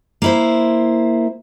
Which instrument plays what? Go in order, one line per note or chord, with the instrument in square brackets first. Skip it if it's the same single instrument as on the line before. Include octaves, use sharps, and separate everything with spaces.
[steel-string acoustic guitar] A#3 E4 C5